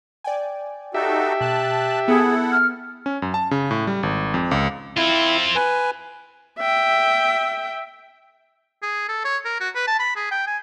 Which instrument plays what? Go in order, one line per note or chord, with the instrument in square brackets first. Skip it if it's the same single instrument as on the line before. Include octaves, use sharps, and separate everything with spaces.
[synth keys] D5 G5 G#5
[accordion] D#4 F#4 A4 [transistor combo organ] G4 E5
[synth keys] B2 [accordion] A5 F#6
[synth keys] B3 [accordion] E4 A4 F#5 [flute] G#4
[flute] F6
[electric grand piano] C#4
F#2
A5
C#3
A2
G3
G#1
F2
C#2
[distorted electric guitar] C4 F4 [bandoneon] E4
[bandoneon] B4 G#5
[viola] E5 G5
[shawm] G#4
A4
C#5
A#4
F#4
B4
A5
B5
G#4
G5
G#5